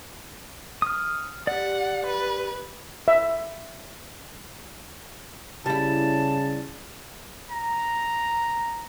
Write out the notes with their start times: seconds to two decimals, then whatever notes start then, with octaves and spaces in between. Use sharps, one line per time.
0.82 D#6 F6
1.47 G4 D5 F#5
2.06 B4
3.08 E5
5.66 C#3 G3 E4 A5
7.51 A#5